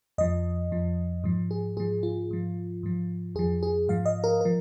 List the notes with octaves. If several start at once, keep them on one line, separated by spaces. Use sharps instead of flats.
F2 F3 D#5
F2 F3
G#2 F3
G#4
G#2 F3 G#4
F4
G#2 F3
G#2 F3
F2 F3 G#4
G#4
G#2 F3 F5
D#5
A#4
F3 A#4